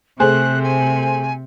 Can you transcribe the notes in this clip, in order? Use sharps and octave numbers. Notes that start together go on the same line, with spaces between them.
C3 A3 G#4 C5 F#6
G#5